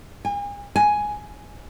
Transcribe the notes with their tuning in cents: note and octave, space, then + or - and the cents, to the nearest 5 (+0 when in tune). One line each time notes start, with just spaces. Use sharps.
G#5 -40
G#5 +5